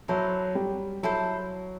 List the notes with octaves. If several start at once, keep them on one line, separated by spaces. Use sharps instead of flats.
F#3 E4 A4 C5
G3
F#3 E4 A4 C5